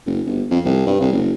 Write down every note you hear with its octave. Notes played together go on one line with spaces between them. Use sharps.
F#1
G1
F2
C2
G2
C2
F#1